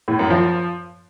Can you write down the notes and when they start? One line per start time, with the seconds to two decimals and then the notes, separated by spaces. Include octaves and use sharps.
0.08 A2
0.19 F#2
0.30 F3